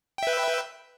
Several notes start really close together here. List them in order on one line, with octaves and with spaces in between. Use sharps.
G5 E5 B4